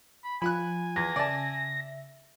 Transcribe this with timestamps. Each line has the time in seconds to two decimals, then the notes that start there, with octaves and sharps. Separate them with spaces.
0.24 B5
0.42 F3 F4 G#5 B5 F#6
0.96 E2 A#6
1.16 C#3 D5 E5 A5